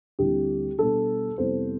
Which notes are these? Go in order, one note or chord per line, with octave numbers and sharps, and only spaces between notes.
D2 D3 G3 C4 E4 G4
B2 G3 D4 A4
F2 C3 G3 B3 E4 A4 C5